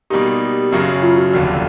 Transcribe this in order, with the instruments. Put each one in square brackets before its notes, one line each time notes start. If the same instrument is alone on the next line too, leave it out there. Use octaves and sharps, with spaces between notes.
[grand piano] B2 G3 A#3 D#4 [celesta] G4
[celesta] G4
[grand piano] F#1 F#2 C#3 F#3
[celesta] F4
F#4
[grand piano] F1 D#2 D3